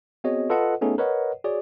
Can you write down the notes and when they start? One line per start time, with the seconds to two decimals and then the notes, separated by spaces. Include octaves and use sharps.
0.24 B3 C4 F#4 G#4 C#5 D#5
0.50 F4 A4 B4 D#5 F#5
0.81 A3 B3 C#4 D#4 G#4 A4
0.98 A#4 B4 C#5 D#5 F#5
1.44 F#4 G#4 C#5 D5